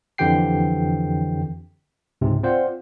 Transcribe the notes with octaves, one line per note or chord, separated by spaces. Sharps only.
F2 D3 E3 G4 G5 C7
C#2 G#2 C3
C4 F4 C5 D5 F#5